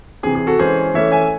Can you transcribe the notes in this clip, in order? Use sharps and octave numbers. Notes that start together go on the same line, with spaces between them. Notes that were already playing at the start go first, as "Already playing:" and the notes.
C3 E3 C4 G#4
G#4
F#4 A4
E3 G#3 C#4 G#4 C5
E3 A3 C#4 C#5 E5
E5 G#5